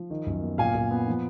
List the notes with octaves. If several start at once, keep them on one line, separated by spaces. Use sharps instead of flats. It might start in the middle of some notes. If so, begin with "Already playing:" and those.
Already playing: F3
D#3
F#2
B3
A#2 F5 G#5
A#2
B3
F3